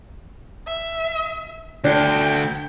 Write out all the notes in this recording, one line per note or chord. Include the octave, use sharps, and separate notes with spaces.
E5
D2 D4 G5